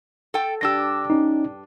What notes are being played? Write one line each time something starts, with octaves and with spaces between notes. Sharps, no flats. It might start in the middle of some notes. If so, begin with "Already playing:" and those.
A4 G5
G2 D4 G4 E6 A#6
C#4 D#4